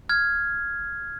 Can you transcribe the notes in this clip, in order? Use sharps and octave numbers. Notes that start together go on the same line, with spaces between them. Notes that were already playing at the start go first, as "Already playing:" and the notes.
F6 G#6